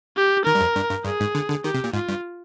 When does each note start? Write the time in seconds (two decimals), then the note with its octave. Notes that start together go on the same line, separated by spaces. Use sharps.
0.17 G4
0.46 D#3 A#4
0.55 G2
0.61 F2
0.76 G2
0.90 G2
1.05 G2 G#4
1.20 G#2
1.35 D3
1.50 D3
1.64 D#3 G4
1.74 C3
1.84 A#2
1.93 G#2 F4
2.09 G2